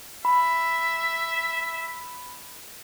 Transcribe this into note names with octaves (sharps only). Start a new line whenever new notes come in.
E5 B5